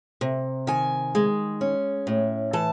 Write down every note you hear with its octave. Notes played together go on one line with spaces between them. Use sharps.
C3
D#3 G#5
G#3
C#4
A2
E3 A5